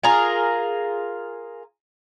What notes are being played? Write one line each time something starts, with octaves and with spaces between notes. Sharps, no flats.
F4 G#4 A#4